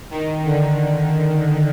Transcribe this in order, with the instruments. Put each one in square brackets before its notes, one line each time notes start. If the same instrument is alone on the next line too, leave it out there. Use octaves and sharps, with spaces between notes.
[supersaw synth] D#3
D3